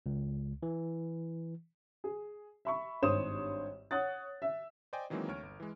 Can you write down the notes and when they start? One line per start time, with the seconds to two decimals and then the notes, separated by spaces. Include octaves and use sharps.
0.06 C#2
0.63 E3
2.04 G#4
2.65 E5 B5 C#6
3.02 G#1 G2 C5 C#5 D#6 E7
3.91 C#5 F#5 D#6 F#6 A6
4.42 E5
4.93 C5 D5 D#5 G5 G#5
5.10 D#3 E3 F#3 G#3 A#3 C4
5.28 D2 C#5 F6 D7
5.43 G1
5.60 E3 G#3